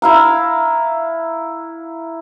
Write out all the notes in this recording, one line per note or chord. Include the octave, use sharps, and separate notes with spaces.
E4 F5 A#5